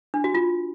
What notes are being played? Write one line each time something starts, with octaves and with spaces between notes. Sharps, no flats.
D4
F#4
F4